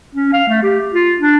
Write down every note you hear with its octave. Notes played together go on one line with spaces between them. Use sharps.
C#4
F5
A3
G4
F4
D4